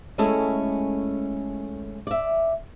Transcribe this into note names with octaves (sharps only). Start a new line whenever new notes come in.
G#3 A3 C#4 E4 A4 D#5
D5 E5